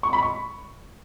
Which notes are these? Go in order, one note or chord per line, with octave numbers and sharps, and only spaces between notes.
C#6
B5
C#6